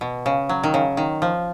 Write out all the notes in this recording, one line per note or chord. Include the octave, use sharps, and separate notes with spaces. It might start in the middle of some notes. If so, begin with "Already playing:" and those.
B2
C#3
F#3
D#3
C#3
D#3
F3